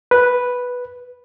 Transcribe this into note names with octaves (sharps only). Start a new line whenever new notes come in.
B4